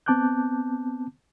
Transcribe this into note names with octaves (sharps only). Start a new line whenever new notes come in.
B3 C4 A5 D6 F#6 G6